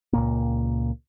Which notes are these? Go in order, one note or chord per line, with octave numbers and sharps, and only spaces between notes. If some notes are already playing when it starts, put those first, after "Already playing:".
C#2 A#2 A#3